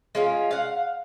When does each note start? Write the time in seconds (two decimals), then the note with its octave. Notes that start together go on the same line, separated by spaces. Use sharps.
0.15 G#3 C#4 F4
0.51 F5 F#5